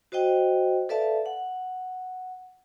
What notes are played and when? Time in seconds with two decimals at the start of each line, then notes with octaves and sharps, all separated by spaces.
0.12 F#4 C5 D#5 G5
0.89 A4 B4 D5 E5 F5 A5
1.26 F#5